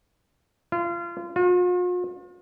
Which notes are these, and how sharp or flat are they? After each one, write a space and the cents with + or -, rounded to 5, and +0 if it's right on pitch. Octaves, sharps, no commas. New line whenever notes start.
F4 -30
F4 +45